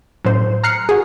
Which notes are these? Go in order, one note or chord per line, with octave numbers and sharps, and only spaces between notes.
F#2 A2 C5
A#5 F6 F#6 C7 C#7
F#4 G#4